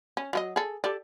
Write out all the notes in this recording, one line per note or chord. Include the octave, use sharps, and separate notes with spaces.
C#4
F#3 F4 D#5
G#4 A4
G4 A4 D5